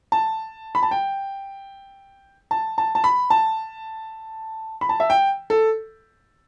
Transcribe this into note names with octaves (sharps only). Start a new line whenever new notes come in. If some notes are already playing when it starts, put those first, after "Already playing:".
A5
B5
A5
G5
A5
A5
A5
B5
A5
B5
A5
E5
G5
A4